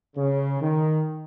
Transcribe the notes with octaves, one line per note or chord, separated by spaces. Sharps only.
C#3
D#3